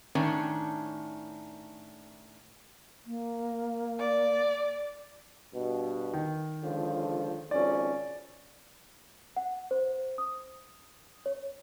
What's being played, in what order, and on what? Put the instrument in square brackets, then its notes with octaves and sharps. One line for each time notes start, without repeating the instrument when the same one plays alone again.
[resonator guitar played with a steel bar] A2 D#3 C#4 D4
[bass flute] A#3
[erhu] D5
[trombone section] G2 B2
[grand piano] D#3
[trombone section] C#2 D3 F3
[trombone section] G#1 F2 C#4 [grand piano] D5
[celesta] F#5
C5
D#6
C#5